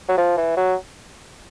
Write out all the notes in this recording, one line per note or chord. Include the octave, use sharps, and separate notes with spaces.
F#3
F3
E3
F#3